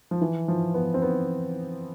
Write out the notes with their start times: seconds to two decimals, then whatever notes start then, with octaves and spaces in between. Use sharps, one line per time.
0.11 F3
0.21 E3
0.48 F3
0.74 B3
0.94 C4
1.02 B3